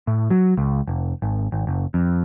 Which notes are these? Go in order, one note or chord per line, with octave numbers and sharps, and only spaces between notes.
A2
F#3
C#2
F1
G#1
G#1
F#1
F2